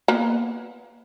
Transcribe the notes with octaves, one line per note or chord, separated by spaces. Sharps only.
A#3 B3